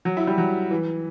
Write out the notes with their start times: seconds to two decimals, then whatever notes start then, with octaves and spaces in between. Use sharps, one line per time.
0.05 F#3
0.17 E4
0.27 G3
0.38 F#3
0.71 E3